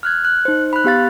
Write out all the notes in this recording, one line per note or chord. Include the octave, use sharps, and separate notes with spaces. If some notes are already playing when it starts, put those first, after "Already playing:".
F6 F#6 G#6
F#6
D#4 C5
B5 F#6
B3 G4 F5 A6